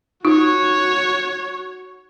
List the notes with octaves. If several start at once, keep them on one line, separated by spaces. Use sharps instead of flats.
D#4 F4 F#4 C#5